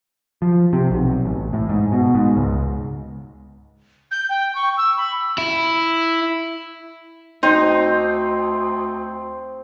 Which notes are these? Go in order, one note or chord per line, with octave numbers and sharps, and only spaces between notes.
F3
C3
B1
A1
A2
G#2
B2
G#2
C#2
G6
G5
C#6
E6
B5
E4
D2 C4 D#4 C5